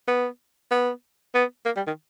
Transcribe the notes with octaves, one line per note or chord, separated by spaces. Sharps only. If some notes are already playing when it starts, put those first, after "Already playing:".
B3
B3
B3
A#3
G3
D#3